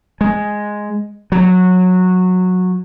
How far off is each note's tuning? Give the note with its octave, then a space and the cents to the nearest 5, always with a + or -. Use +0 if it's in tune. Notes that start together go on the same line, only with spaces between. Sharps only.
G#3 +0
F#3 -15